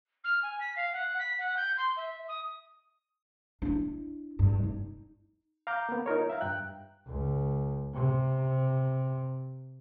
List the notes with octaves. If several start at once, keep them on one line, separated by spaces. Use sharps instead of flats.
F6
G#5
B6
F5
F#5
B6
F#5
G6
C6
E5
D#6
D4 E4
G2
D#4
F5 A#5 D6 G6
A#3 B3
D#4 F4 A#4 C#5
E5 F5 A#5
G2 G5 F#6
C#2
C3